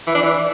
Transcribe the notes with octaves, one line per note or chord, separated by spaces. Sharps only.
E3
D4
E3